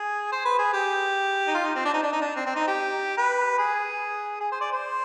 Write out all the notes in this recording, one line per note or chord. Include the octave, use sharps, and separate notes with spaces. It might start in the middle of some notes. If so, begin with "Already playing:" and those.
Already playing: G#4
C5
B4
G#4
G4
D#4
F4
D#4
C4
D4
D#4
D4
D#4
D4
C4
C4
D#4
G4
B4
G#4
G#4
C5
D5
C5